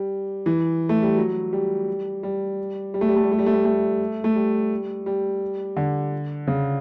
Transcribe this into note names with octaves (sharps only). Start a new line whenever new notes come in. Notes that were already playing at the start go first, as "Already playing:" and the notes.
Already playing: G3
E3
A3
G3
F#3
G3
G3
G3
A3
G3
A3
G3
A3
G3
A3
G3
A3
A3
G3
G3
D3
C#3